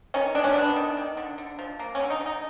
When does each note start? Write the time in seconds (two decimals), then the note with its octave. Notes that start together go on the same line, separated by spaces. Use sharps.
0.14 D#3 C#4
0.35 G#3 D4
0.44 C#4
0.53 B3 D4
0.76 D#3
0.97 D#3
1.17 D3
1.38 D3
1.59 F3
1.79 A#3
1.95 C#4
2.00 D3
2.10 D#4
2.21 D3
2.26 D#4